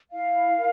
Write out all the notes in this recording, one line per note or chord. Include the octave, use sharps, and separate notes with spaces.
E4 F5
A#4